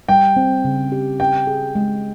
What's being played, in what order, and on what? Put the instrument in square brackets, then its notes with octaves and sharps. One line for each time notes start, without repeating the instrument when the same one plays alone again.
[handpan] G3 [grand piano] G5
[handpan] C4
C#3
G4
[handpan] C#4 [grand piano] G5
[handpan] G#4
G#3